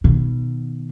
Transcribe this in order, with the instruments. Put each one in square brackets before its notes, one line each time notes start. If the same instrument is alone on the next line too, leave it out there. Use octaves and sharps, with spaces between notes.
[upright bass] B2 D#3